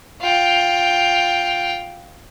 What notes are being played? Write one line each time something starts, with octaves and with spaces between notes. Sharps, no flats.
F4 G5